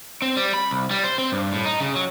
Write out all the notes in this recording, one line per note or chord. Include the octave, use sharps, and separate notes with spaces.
C4
G3
B5
C2
G3
C5
C4
G2
A2
D#4
C#3
F#3